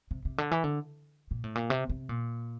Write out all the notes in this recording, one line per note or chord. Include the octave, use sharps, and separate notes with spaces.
C3
C3
D3
E3
D3
A#2
A2
A#2
C3
C3
A#2